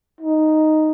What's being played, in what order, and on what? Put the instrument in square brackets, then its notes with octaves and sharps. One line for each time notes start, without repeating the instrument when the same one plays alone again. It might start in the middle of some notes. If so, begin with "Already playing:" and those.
[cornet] D#4